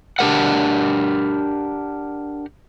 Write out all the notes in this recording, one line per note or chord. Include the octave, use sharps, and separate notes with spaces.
D4 G4 A#4 F#5